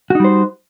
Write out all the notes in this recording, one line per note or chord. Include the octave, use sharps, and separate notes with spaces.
G3 D#4 F#4 C5